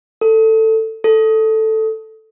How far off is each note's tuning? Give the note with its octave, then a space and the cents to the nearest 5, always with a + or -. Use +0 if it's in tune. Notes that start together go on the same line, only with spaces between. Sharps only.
A4 +15
A4 +0